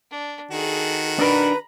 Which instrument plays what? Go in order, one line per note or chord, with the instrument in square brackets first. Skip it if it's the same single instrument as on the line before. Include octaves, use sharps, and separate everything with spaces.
[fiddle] D4
[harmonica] D#3 F#4 [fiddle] G#4 A4
[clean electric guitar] D4 A#4 [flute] B4 [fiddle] A#5 B5